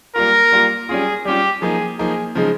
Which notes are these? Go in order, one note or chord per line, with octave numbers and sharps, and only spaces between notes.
G3 A#3 F4 A#4
G3 A#3 F4
G3 C#4 F4 G#4
G3 C#4 F4 G4
F3 A#3 D#4 G#4
F3 A#3 D#4 G#4
C#3 F3 G#3 D#4